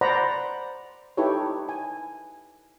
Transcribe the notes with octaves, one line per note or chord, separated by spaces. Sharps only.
C5 D5 F#5 A#5 B5
D#4 E4 G4 A4 B4 C#5
G#5